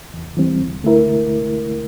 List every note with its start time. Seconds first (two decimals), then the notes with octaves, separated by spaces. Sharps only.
0.14 E2
0.37 E3 G3 C4
0.61 D2
0.83 D3 A3 E4 A#4